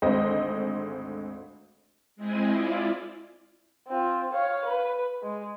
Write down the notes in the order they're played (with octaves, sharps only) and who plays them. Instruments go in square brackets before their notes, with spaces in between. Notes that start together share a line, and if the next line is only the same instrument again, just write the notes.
[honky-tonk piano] G#1 D2 G#3 C4 C5 D#5
[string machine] G#3 C4 E4 D#5 G#5
E4 F4 D5
[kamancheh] C4 F4
C#5 F5
B4
G#3